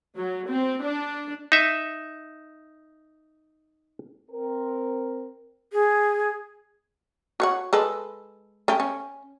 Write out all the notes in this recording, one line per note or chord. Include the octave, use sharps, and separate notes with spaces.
F#3
C4
D4
D#4 E5
C4 A#4
G#4
F#4 C#5 F#5
G#3 A4 B4
A3 C#4 G4
C#4